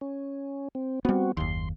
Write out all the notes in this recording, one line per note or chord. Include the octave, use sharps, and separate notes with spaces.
C#4
C4
G3 B3 C4 F#4
F#1 D#2 C6